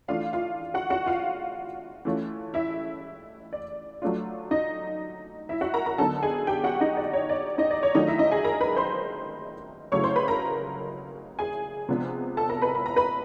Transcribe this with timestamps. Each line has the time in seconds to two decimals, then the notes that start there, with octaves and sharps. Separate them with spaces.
0.08 E3 A3 D4 F4 F5
0.33 F4 F5
0.74 F#4 F#5
0.90 F#4 F#5
1.06 F4 F5
2.05 E3 A3 C#4 F4
2.54 E4 E5
3.53 D5
4.02 F#3 A3 D4 F4
4.51 D#4 D#5
5.49 E4 E5
5.61 F#4 F#5
5.74 A#4 A#5
5.86 A#4 A#5
5.98 D3 F#3 B3 D#4 A4 A5
6.23 G#4 G#5
6.47 G4 G5
6.64 F#4 F#5
6.80 D#4 D#5
6.97 D5
7.13 C#5
7.29 D5
7.58 D#4 D#5
7.71 D5
7.83 C#5
7.95 D#3 F#3 A3 D4 D#4 F4 D#5
8.08 E4 E5
8.19 D#4 D#5
8.31 G#4 G#5
8.44 A#4 A#5
8.61 B4 B5
8.76 C5 C6
9.92 C#3 F#3 A3 C#4 E4 C#5 C#6
10.03 C5 C6
10.16 B4 B5
10.28 A#4 A#5
11.39 G#4 G#5
11.89 C3 F3 G#3 B3 D4
12.37 A4 A5
12.49 A#4 A#5
12.62 B4 B5
12.75 B5
12.86 A#5
12.96 B4 B5